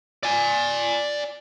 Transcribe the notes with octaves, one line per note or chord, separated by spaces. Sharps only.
D5 G#5